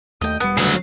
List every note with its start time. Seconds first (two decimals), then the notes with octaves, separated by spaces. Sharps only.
0.21 D#2 A3 D#5 G5
0.40 E1 G3 B3
0.58 D2 C#3 F#3